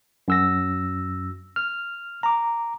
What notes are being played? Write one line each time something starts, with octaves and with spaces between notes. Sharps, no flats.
F#2 E6 A#6
F6
A#5 D6